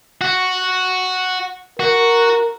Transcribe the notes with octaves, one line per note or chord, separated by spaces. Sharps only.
F#4
F#4 A#4